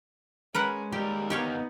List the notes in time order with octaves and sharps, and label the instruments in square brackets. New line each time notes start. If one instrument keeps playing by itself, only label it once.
[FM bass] G#3 [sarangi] C#4 [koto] A#4 B4 F#5
[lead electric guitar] D#2 A#4 [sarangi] G3 [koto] G4
[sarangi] B3 [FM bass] D#4 [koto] G4 C#5 F5